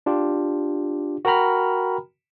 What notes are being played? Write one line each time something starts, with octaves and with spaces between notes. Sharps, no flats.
D4 F4 G4
F#4 A#4 G5 A#5 B5 F6